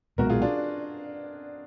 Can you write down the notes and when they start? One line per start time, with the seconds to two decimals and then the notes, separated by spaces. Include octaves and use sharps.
0.18 B1 A#2 G#3 B3 F#4 A#4
0.30 F4 G#4
0.42 D4 F4